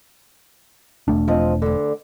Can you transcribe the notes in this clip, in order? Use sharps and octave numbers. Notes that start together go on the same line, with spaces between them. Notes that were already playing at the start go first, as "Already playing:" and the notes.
E1 A3 D4
F3 C4 D#5
D2 D3